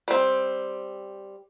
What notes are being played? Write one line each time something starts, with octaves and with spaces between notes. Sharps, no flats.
G3 C4